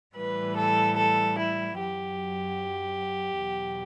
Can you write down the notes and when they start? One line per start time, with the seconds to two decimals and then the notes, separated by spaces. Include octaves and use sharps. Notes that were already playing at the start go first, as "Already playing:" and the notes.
0.16 A2 E3 G3 B4
0.57 A4
0.97 A4
1.38 E4
1.78 F#2 F#3 G4
3.40 E2 B2 F#3